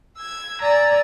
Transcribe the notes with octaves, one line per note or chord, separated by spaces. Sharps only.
E6 G#6
D5 G#5 A#5 E6